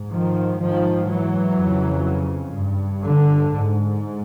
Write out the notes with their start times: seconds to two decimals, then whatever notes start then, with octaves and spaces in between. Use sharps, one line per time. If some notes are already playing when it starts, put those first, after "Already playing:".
Already playing: G#2
0.12 D#3 F3
0.60 G#2 D#3 F3
1.09 E3 F#3
1.58 F2 C#3
2.55 G2
3.04 D3
3.52 G#2